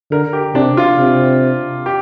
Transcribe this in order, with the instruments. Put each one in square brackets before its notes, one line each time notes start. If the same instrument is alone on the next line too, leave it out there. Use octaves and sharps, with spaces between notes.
[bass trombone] D3 [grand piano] A#4
[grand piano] G4
[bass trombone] C3 [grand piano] D4
[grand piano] F4
[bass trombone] C3
[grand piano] G4